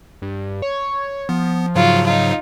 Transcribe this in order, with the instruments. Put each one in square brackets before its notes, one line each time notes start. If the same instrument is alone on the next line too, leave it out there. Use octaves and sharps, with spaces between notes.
[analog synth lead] G2
C#5
[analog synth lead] F3 [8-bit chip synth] B3
[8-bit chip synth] G#2 C#3 F#3 [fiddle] F4 F#4
[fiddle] D#4 F4